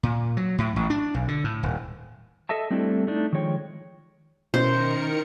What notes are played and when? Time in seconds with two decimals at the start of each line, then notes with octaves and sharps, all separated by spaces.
0.03 A#2
0.37 F#3
0.58 A2
0.76 A1
0.90 D4
1.14 B1
1.28 D3
1.44 A2
1.63 D#1
2.49 A4 D#5 E5 A5
2.70 G3 A3 C4 D4 E4 A4
3.07 A3 D4 D#4
3.33 D#3 F3 G#3 C#5 G5
4.54 B2 D#3 C#4 E4 A#4 C5 C#7